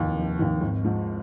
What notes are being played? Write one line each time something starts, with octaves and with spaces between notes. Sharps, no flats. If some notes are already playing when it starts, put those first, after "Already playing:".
Already playing: F1 D#2 D#3
F1
D#2 D#3
G#1
G#2 F3